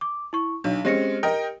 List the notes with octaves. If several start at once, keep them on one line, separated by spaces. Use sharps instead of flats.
D6
E4 C#6
B1 D4
G#3 C4 C#4 G4 A#6 C#7
A#4 D#5 G5